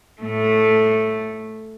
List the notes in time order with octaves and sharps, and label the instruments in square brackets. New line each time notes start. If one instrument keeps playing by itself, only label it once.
[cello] A2 A3